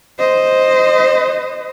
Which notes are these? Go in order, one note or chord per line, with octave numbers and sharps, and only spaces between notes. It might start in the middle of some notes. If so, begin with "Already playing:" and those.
C5 D#5